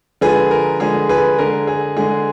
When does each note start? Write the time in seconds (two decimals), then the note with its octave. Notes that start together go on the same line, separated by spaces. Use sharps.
0.21 D3 F3 G#3 G#4 B4
0.51 A#4
0.80 D3 F3 G#3 G#4
1.09 G#4 B4
1.38 D3 G#3 A#4
1.67 G#4
1.97 D3 G#3 G#4